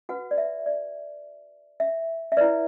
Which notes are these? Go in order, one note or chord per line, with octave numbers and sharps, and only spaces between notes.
F#4 B4 F#5
D5
E5
D5
E5
E5
E4 B4 D5